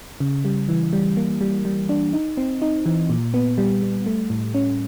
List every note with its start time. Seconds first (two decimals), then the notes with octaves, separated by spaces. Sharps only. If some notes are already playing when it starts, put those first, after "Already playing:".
0.20 C#3
0.45 G3
0.69 E3
0.93 G3
1.17 A#3
1.41 G3
1.65 G3
1.89 D4
2.13 D#4
2.37 C4
2.62 D#4
2.86 E3
3.10 A#2
3.34 B3
3.58 G3
3.82 G3
4.06 A3
4.30 A2
4.54 C#4